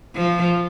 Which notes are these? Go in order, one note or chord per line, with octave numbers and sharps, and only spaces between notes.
F3